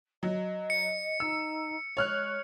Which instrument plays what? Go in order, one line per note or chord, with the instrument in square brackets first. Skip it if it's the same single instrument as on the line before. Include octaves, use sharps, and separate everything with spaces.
[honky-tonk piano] F#3 [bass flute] D#5
[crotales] C#7
[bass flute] D#4 [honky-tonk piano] E6
[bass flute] G#3 [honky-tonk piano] C#5 F6 F#6